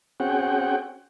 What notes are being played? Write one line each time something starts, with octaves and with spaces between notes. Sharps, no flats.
C4 C#4 F#4 G#4 F#5 G5